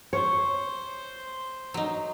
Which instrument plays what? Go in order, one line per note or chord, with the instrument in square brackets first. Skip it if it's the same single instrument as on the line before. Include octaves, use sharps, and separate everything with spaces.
[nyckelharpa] C5 [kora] C#5
[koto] F#3 D#4